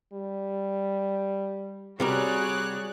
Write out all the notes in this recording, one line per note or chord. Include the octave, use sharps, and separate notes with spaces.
G3
C3 G3 F#4 G#4 A#4 C#5 D5 F#6